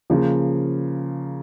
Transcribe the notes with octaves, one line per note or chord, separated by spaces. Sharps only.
C#3 F3 A#3